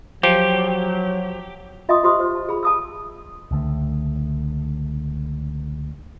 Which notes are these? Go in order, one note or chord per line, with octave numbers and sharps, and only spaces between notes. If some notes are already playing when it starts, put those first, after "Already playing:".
F3 F#3 G4
F4 D#5 E5 G#5 C6 D#6
F4 G4 C5 C6 D#6
C5
A5
G#4 B5
A5 D#6 E6
C#2 D3 A3